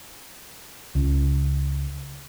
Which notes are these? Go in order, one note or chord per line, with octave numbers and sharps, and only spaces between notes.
C#2